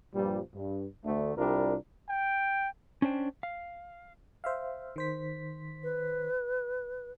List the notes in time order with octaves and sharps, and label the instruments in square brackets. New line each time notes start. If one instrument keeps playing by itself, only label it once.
[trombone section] G2 A#2 F3 G3
G2
D2 D3 A3
C2 G3 D4 F4 A#4
[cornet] G5
[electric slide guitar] C#4 D4 C5 G5
F5
[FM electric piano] C5 E5 F5
D#3 C5 B6
[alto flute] B4